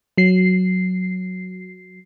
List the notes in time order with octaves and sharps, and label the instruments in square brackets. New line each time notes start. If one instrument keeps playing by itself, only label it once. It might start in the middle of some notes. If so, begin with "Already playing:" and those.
[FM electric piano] F#3 C7